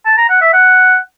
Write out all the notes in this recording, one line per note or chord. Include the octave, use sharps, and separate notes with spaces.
A5
A#5
F#5
E5
F#5